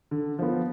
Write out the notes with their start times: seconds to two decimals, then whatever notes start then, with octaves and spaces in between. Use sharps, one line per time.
0.11 D3
0.39 F3 B3